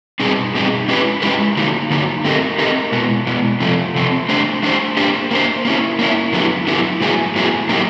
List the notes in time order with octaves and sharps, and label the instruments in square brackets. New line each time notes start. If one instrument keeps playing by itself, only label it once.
[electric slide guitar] B2 G3 C4 D#4 G#4
B2 G3 C4 D#4 G#4
G#3 C#4 E4 G4 B4
G#3 C#4 E4 G4 B4
D3 F#3 A#3 D#4
D3 F#3 A#3 D#4
A3 C4 D#4 G4 A#4
A3 C4 D#4 G4 A#4
B2 G#3 B3
B2 G#3 B3
C3 F3 A3 C4
C3 F3 A3 C4
A3 D4 G4 C5
A3 D4 G4 C5
A#3 D4 G4 C5
A#3 D4 G4 C5
A#3 C#4 E4
A#3 C#4 E4
D3 F#3 B3 E4 G4
D3 F#3 B3 E4 G4
A2 F#3 B3 E4 G#4
A2 F#3 B3 E4 G#4
F#3 A#3 D#4 G4